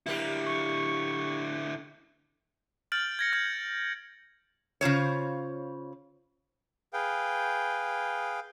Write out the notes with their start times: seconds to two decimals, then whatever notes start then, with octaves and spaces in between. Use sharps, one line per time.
0.06 D3 G3 A#3 E4 G4
0.46 C#6
2.92 F6 G6 A6 D7 F#7
3.19 G#6 A#6 C#7
3.33 F6 G6 G#6 A#6 F#7
4.81 C#3 F4 C5 C#5
6.93 G#4 B4 F5 G5